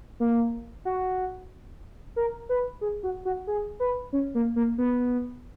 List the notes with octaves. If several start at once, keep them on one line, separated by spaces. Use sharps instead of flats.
A#3
F#4
A#4
B4
G#4
F#4
F#4
G#4
B4
C#4
A#3
A#3
B3